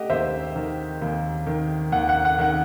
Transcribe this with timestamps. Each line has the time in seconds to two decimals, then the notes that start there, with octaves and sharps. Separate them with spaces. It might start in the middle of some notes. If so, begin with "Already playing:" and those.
Already playing: A3 G4 D#5 F#5
0.10 D#2 C5 E5
0.56 D#3
1.02 D#2
1.47 D#3
1.92 D#2 F#5
2.09 F#5
2.25 F#5
2.38 D#3 F#5